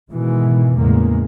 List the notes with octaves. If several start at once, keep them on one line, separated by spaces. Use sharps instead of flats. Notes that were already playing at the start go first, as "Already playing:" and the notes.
G#2 B2 D#3 E3 G#3
E2 A2 C#3 G#3 A#3